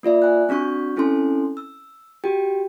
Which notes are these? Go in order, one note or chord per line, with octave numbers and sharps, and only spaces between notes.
A#3 F4 D5 E5
G#5 F#6
C4 D4 F#4 C#6 G6
C4 C#4 E4 A4 G#5 C6
E6
F#4 G4 G5